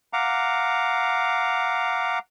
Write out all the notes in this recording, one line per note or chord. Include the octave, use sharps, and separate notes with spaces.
F5 F#5 A#5 D6